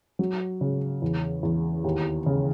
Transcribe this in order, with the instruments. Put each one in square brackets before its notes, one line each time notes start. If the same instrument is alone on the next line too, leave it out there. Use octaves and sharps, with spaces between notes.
[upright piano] F#3
C#3
E2
E2
D#2
C#3